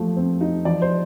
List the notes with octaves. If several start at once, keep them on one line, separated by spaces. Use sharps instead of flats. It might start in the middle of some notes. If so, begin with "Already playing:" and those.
Already playing: F3 A3
C4
D#4
F3 D5
C5